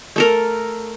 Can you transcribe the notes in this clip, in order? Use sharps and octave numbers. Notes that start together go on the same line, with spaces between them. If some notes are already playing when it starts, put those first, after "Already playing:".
A3 A4 A#4